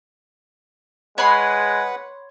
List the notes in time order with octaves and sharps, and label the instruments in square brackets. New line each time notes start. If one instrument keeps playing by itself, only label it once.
[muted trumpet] G#3 [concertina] B4 F#5 [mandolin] C#5 B5 C6